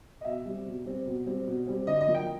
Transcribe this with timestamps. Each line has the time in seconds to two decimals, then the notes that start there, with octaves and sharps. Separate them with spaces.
0.21 D#5
0.25 B2 E5
0.45 G3 C4
0.66 B2
0.85 G3 C4
1.06 B2
1.26 G3 C4
1.47 B2
1.67 G3 C4
1.87 D3 D#5
2.01 D#5
2.07 F3 A#3
2.15 G5